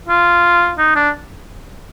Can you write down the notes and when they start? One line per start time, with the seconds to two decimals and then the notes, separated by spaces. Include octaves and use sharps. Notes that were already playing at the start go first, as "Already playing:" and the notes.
0.08 F4
0.78 D#4
0.96 D4